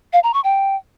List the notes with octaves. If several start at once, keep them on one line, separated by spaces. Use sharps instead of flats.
F5
A#5
C#6
G5